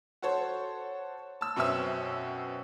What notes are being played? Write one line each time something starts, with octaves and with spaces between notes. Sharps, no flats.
F#4 A4 C5 C#5
A5 E6
F#2 B2 C4 C#4 E5 E6